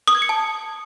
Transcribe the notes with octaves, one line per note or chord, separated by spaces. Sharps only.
D#6
G#6
C#7
A5